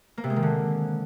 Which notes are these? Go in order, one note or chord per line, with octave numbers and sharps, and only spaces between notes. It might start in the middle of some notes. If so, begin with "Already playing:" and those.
A#3
C3
G#3
D#3
D3